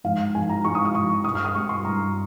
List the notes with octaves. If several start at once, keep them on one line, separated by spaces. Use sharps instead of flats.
G#2 F3 F5
G#2 F3 G#5
A#5
G#2 F3 C#6
D#6
D#6
G#2 F3 C#6
G2 G3 D#6
F6
D#6
G2 G3 C#6
C6
G2 G3 A#5